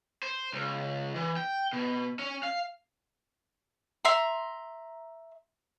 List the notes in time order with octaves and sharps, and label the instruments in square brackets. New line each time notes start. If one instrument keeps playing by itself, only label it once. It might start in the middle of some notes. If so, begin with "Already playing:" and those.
[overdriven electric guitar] C5
C#2
E3
G5
B2
C#4
F5
[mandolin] E5 A#5 C6